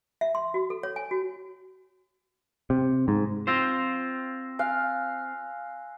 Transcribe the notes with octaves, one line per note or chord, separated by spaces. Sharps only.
E5
C6
F#4
A4
C#5
G#5
F#4
C3
G#2
C4 F4 C5 C6 E6 A#6
F5 G#5 F#6